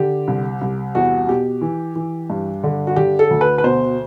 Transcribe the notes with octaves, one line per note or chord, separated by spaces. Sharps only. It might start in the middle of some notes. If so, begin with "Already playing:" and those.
Already playing: D3 G4
C2
C2
E2 F#4
B2 G4
E3
E3
G2
D3
F#4
D3 G4
A4
D2
B4
B4
B2 C5